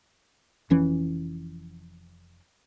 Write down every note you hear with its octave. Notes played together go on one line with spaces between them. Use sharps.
F1 F2 E3 C#4